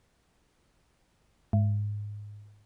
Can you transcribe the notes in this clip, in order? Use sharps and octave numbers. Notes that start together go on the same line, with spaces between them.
G#2